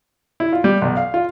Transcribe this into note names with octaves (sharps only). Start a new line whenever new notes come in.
E4
F4
G3
B1
F5
F4